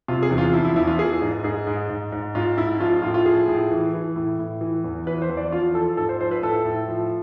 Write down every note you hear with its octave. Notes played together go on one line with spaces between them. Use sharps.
C3 F4
G#4
E2
F4
F3 E4
E4
E2 E4
F4
E3 G#4
G#2
G#2 G#4
G#2
G#2
G#2
G#2 F4
G#2 E4
F3 F4
F4
A2 F4
F4
F3 G#4
A2
E3
E3
A2
A2
E3
E2
E3 B4
C5
E2
D5
F3 F4
F3 A4
G#2 A4
C5
F3 C5
B4
A2 A4
A2
F3